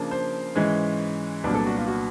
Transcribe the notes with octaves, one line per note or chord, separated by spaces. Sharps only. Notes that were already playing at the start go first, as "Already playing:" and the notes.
Already playing: C#3 F3 A#3 D4
C5
G#2 E3 G#3 C#4
C2 A#2 F#3 B3 D4
A4
F#4
F4
F#4